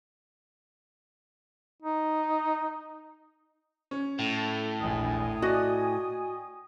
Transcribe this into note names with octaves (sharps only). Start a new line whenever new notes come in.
D#4
C#4
A2 A4
E1 A#1 G5 G#5 D#6
F#4 D5 D#5